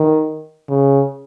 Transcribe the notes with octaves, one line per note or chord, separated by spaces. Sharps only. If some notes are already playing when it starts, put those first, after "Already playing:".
Already playing: D#3
C#3